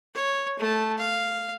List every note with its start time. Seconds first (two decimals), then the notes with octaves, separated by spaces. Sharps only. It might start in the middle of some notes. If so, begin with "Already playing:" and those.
0.14 C#5
0.59 A3 A5
0.98 F5